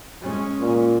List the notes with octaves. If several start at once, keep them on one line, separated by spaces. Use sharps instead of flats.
G#3 C#4
A#2